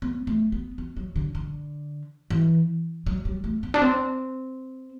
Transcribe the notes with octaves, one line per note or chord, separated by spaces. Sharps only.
B3
A3
B3
B3
F#3
D3
D3
E3
F#3
G3
A3
B3
D4
C4